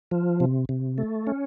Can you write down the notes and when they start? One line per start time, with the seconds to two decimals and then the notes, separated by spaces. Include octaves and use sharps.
0.11 F3
0.40 C3
0.69 C3
0.98 A3
1.27 C#4